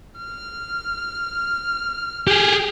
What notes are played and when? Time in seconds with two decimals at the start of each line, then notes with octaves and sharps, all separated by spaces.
0.18 F6
2.28 G4 G#4